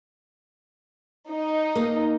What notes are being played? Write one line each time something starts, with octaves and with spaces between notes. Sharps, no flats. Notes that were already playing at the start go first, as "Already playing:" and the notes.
D#4
A#3